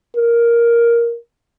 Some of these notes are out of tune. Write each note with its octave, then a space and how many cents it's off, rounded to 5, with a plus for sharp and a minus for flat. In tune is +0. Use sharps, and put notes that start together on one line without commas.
A#4 +5